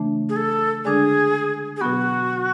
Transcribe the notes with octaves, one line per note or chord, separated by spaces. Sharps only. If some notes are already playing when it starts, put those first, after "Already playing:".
Already playing: C#3 E3 A3 D4
G#4
A4
D3 G#3 D4 G#4
G#4
B2 F#3 B3 F#4